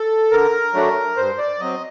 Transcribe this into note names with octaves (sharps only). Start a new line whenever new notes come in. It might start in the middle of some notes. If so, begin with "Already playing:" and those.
Already playing: A4
D3 A#4
F#3 A3 D4
G2 C5
D5
F#3 C4 D#5